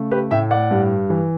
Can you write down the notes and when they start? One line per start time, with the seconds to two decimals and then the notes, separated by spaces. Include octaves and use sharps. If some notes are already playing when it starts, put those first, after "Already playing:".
Already playing: C#3 A3
0.11 G4 B4
0.31 A2 E5 G5
0.51 D5 F#5
0.71 G2
1.10 E3